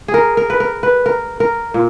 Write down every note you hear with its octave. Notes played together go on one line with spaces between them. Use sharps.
G#4
A#4
A#4
B4
A#4
B4
A#4
A#4
A#2